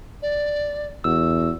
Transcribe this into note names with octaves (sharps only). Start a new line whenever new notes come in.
D5
E2 F#4 E6